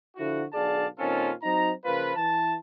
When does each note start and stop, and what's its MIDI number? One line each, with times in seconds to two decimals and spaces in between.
0.16 0.43 50
0.16 0.43 53
0.16 0.43 64
0.16 0.43 66
0.53 0.86 35
0.53 0.86 50
0.53 0.86 68
0.53 0.86 74
0.53 0.86 77
0.53 0.86 81
0.99 1.31 46
0.99 1.31 51
0.99 1.31 60
0.99 1.31 61
0.99 1.31 65
0.99 1.31 69
1.43 1.71 54
1.43 1.71 60
1.43 1.71 63
1.43 1.71 82
1.85 2.13 49
1.85 2.13 53
1.85 2.13 58
1.85 2.13 65
1.85 2.13 71
2.15 2.56 52
2.15 2.56 81